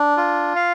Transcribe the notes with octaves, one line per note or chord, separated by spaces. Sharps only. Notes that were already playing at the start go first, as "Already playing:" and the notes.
Already playing: D4
F4
F5